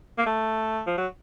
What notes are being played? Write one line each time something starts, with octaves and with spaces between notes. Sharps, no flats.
A#3
A3
F3
F#3